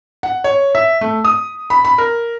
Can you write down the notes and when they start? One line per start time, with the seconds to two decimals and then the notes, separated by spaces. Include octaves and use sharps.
0.23 F#5
0.44 C#5
0.75 E5
1.01 A3
1.25 D#6
1.70 B5
1.85 B5
1.98 A#4